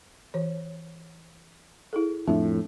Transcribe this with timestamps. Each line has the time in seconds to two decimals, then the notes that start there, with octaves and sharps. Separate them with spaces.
0.34 E3 C#5
1.93 E4 G#4 A4
2.28 F2 A2 D4 E5